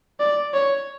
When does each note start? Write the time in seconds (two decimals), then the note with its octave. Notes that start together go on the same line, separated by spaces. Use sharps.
0.20 D5
0.54 C#5